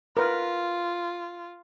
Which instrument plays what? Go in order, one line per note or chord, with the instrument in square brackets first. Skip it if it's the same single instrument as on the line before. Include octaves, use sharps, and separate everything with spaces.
[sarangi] F4 [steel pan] A#4 B4